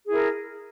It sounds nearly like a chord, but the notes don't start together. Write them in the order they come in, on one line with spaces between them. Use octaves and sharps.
G#4 E4 A#4